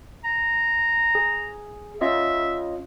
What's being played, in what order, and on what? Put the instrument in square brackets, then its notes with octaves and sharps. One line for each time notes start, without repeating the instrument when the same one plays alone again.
[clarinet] A#5
[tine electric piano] G#4
[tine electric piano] C#4 F4 D#5 [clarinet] E5